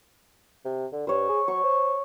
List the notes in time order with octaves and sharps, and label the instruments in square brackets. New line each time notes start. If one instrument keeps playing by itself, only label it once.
[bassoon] C3
D3
[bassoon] G2 [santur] C5 C#5
[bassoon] G#4
[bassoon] F#3 [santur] C#6
[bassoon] C5